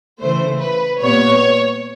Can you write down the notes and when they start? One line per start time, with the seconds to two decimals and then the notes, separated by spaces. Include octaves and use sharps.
0.21 C#3 E3 A3 C5
0.61 B4
1.01 A#2 G3 B3 C#5